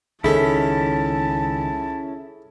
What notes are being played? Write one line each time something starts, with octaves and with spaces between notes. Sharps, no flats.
C#2 D#3 C#4 E4 G#4 A4 A5